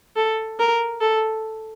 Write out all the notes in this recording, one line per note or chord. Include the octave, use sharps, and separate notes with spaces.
A4
A#4
A4